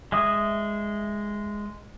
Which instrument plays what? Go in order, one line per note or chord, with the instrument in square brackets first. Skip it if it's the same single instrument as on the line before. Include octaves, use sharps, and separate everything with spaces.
[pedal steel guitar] G#3 E5 D#6